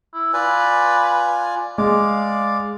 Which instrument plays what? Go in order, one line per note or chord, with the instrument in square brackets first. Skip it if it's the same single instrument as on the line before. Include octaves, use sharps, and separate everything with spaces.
[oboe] E4
[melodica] F4 D5 G#5 [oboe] B4
[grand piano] G#3 [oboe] D5 [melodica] F5 D6